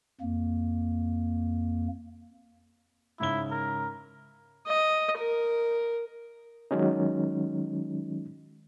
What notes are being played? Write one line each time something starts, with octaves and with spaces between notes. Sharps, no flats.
F2 A#3
G#2 C#3 E4 G7
A#4
D#5
A#4
D#3 F#3 G#3 C#4 D#4